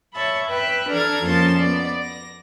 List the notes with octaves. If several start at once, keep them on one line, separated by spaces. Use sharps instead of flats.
C#5 E5 A5 B5
B4 E5 G5 F#6
E3 D4 A4 A#5 F6 G#6
F2 F3 A#3 C#4 A5 C6
B3 D5
A#6